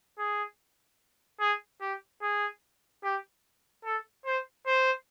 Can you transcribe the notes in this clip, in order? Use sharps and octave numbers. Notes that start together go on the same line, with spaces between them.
G#4
G#4
G4
G#4
G4
A4
C5
C5